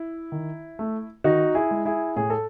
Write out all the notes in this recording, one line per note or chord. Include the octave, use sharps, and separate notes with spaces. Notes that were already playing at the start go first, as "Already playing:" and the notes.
Already playing: E4
D#3
A3
D#3 D#4 F#4
E4 G#4
G#3
E4 G#4
A2 G#4
A4